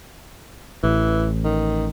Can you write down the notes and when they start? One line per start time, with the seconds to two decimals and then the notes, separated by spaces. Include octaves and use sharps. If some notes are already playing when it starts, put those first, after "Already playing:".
0.83 A1 E3
1.44 D#3